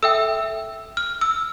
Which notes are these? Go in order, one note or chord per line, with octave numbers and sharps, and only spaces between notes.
A4 E5 G5 E6
F6
E6